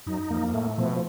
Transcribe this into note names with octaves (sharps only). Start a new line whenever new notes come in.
F#2 D#4
F2 A#3
F2
A2 A3
B2 F3